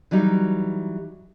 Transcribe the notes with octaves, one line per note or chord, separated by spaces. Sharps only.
E3 F#3 G3 D#4